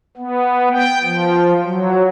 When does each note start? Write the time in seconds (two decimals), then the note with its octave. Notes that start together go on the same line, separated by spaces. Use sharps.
0.17 B3
0.72 G5
1.03 F3
1.65 F#3